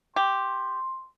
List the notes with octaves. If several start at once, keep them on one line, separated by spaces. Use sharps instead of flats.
G4 C6